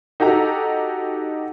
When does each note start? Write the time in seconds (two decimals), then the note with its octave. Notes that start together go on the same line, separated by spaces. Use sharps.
0.20 D#4 F#4 G4 A4 A#5